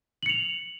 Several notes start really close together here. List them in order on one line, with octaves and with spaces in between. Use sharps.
F#7 C#7 F7